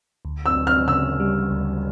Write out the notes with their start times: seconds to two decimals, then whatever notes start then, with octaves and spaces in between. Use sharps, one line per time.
0.25 D2
0.46 E6
0.56 D2
0.67 F6
0.88 C#3 E6
1.20 G3
1.52 D2